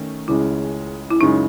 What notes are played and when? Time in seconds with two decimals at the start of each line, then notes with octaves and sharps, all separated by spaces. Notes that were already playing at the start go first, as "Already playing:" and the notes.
Already playing: D#3 A3 C#4
0.28 C#2 C#3 G#3 C#4 E4
1.10 E4
1.21 F#2 C#3 G#3 D#4